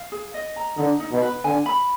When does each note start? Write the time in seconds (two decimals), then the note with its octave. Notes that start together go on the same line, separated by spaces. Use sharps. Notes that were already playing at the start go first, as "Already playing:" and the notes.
Already playing: F5
0.12 G#4
0.34 D#5
0.56 A#5
0.77 D3 D#4
1.00 D#4
1.12 B2
1.22 B4
1.44 D3 G#5
1.66 B5